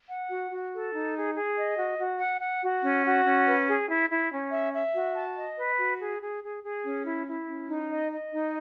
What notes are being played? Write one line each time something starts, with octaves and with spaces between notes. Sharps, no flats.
F#5
F#4
F#4
A4
D#4
G#4
G#4
D#5
F#4
F#4
F#5
F#5
F#4
C#4
F#4
C#4
B4
G#4
E4
E4
C#4
E5
E5
F#4
A5
D#5
B4
F#4
G#4
G#4
G#4
G#4
C#4
E4
E4
C#4
D#4
D#5
D#5
D#4